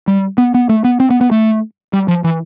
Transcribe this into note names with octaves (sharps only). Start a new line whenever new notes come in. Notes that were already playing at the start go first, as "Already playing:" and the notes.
G3
B3
B3
A3
B3
C4
B3
B3
A3
G3
F3
E3